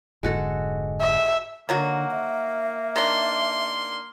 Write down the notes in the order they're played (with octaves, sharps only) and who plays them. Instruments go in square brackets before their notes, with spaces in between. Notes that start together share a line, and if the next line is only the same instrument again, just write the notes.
[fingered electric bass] F1 G#2 D3 [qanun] G#3 F#4 A4
[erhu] E5
[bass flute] D3 [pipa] D#3 F#3 F#4 [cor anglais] A#3
[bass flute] E5
[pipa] D#3 D4 [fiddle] C6